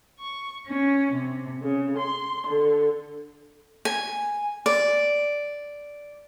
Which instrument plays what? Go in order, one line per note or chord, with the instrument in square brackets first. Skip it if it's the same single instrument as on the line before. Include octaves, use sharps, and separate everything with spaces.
[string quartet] C#6
C#4
C3
C#3
C6
D3
[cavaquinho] G#5
D5